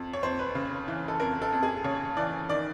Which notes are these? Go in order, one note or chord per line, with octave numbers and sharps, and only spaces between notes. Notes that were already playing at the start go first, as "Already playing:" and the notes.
Already playing: F2
C#5
F2 C5
B4
C#3
E3
A4
F2 A#4
A4
F2
G#4
C#3 C#5
E3 D5
D#3 D5